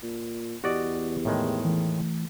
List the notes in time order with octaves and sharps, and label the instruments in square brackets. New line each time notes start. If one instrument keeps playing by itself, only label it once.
[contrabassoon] A#2
[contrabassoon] E2 [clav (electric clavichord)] F#4 D5 D#5 [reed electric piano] G4
[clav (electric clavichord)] A2 D#3 G#3
[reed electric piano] E3 A3